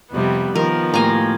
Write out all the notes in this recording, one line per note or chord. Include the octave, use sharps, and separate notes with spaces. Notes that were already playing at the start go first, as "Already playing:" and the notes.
F2 C3 G3 B3
D#3 F3 B3 A#4
A2 A#3 G4 G#5 A#5